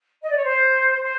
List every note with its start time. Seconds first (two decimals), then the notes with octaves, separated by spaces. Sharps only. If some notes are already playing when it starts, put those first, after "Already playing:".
0.21 D#5
0.28 D5
0.35 C#5
0.42 C5
1.01 C5